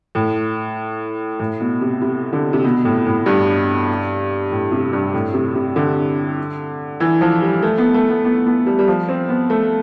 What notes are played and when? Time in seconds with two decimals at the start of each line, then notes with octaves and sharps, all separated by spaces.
0.15 A2
1.39 A2
1.60 B2
1.81 C3
2.01 C3
2.33 D3
2.53 C3
2.64 B2
2.85 A2
3.06 A2
3.26 G2
4.51 A2
4.72 C3
4.93 G2
5.14 A2
5.34 C3
5.55 C3
5.76 D3
7.00 E3
7.21 F3
7.42 G3
7.63 A3
7.78 B3
7.94 A3
8.09 B3
8.25 B3
8.46 B3
8.66 G3
8.79 G3
8.88 F3
9.09 C4
9.29 B3
9.50 A3